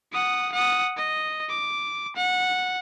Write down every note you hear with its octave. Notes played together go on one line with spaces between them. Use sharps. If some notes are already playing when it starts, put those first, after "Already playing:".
F#5 D#6
F#5 D#6
D#5
D6
F#5